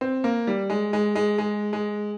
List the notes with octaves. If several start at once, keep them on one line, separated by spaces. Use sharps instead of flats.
C4
A#3
G3
G#3
G#3
G#3
G#3
G#3